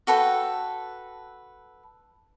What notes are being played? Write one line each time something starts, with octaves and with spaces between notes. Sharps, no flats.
F#4 A4 B4 G5